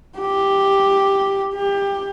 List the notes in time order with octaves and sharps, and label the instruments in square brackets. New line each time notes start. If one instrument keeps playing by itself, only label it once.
[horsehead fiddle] G4
G4